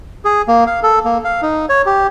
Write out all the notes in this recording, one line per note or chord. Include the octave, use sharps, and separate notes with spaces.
G#4
A#3
F5
A4
A#3
F5
D#4
C#5
G4